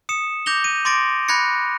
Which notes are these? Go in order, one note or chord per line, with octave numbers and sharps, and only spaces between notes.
D#6 C#7 E7
D6 G6 A#6 F7 G7
D#7
C6 D6 A6 A#6 D7
B5 F#6 G#6 A#6 C#7